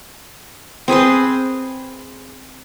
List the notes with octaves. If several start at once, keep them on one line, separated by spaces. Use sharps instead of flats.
C4 G#4 B4 C6